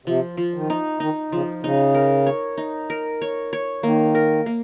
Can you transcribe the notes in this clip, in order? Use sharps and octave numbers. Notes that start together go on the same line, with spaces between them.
C3 F3
F3
D#3
D#4
D#3 D#4
C#3 F3
C#3 D#4
A#4
C#5
D#4
A#4
C#5
C#5
D#3 A#3
A#4
A#3